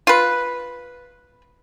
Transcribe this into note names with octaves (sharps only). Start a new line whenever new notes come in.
F4 B4